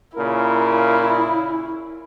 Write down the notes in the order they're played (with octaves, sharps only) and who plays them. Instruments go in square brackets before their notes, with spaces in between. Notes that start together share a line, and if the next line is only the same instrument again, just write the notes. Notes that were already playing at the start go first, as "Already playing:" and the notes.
[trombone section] A#2 C#3 A#4 [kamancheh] E4